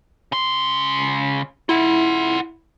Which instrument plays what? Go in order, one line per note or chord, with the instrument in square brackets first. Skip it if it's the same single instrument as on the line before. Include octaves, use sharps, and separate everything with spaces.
[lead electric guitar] C#3 C6
[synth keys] E4 [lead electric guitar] F4 F#5